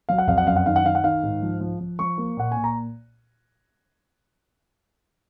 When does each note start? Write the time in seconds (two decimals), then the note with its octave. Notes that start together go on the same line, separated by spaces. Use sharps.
0.09 F#3 F5
0.18 F#5
0.27 F2 F5
0.38 F#5
0.47 F#2 F5
0.56 F#5
0.66 D#3 F5
0.76 F#5
0.84 D#3 F5
0.95 F#5
1.04 D#3 F5
1.23 G#2
1.42 F3
1.61 F3
1.80 F3
1.99 F3 C#6
2.18 A#3
2.37 A#2 F#5
2.52 A#2 G#5
2.64 A#5